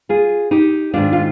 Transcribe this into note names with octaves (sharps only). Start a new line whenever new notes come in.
F4 G#4
D#4 G4
G#2 D#3 G#3 D4 F4
F4